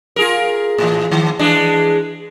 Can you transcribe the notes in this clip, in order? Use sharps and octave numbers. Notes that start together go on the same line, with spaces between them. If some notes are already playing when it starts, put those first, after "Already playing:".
F4 G#4 A#4
A2 E3
D#3
E3 G#3 D4